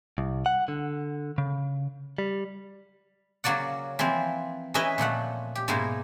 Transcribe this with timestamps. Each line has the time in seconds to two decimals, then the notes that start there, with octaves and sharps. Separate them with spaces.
0.18 C2
0.46 F#5
0.68 D3
1.38 C#3
2.18 G3
3.44 C#3 F#3 A#3 D5 F#5
3.99 E3 F3 A#3 C4
4.74 E3 C#4 D#4 B4 D#5 E5
4.98 A#2 F3 A3 F#5
5.55 G4
5.68 G#2 B2 G#3 A#3 D#4 E4